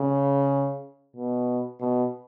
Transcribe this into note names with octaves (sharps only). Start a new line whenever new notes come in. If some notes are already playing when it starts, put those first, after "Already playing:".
Already playing: C#3
B2
B2